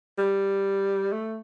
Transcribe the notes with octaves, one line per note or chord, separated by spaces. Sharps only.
G3
A3